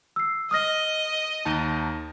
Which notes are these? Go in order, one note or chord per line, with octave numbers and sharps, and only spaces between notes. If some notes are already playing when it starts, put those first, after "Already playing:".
E6 C7
D#5 D#6 F6 A#6
D#2 D#4 A5